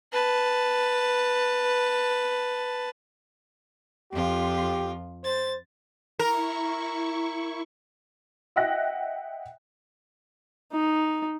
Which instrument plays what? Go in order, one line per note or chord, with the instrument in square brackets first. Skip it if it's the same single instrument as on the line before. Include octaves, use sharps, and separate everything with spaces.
[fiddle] B4 A5
[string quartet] F2 F4 [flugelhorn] G4
[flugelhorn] C5 [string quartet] A6
[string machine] E4 C#6 [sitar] A#4
[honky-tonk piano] D#5 E5 F#5 G5 F#6 A#6
[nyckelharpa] D#4